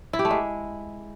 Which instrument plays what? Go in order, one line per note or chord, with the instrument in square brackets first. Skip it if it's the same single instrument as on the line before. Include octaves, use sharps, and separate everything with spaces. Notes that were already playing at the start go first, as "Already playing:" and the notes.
[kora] E4
G4
A3
G#3